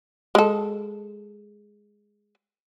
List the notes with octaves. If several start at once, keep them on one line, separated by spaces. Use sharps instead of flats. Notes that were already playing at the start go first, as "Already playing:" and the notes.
G#3 A4